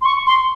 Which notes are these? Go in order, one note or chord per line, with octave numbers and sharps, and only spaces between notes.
C6
C#6
C6